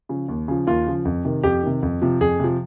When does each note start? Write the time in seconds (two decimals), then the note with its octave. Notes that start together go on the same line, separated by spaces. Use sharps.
0.09 C#3 F3
0.29 D#2
0.48 C#3 F3
0.67 D#2 F4
0.86 C#3 F3
1.05 F2
1.25 C3 D#3
1.44 F2 G4
1.63 C3 D#3
1.83 F2
2.02 C3 F3
2.21 F2 G#4
2.40 C3 F3